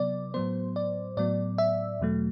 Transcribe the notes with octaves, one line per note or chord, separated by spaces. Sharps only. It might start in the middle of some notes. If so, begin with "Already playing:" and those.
Already playing: C3 F#3 B3 D5
A2 F#3 B3 C5
D5
A2 F#3 B3 D5
E5
E2 B2 F#3 A3